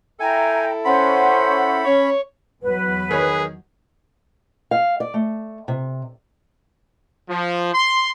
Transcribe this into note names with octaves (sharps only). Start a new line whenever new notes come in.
E4 A4 E5 G5 G#5 A#5
C#4 C5 F#5 B5 C6
C#4 C#5
E2 F#3 B4
D#3 G#4 C#5
F5
D5
A3
C3
F3
C6